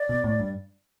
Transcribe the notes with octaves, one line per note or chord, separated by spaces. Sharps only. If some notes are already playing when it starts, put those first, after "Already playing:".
Already playing: D5
B2
A2
G2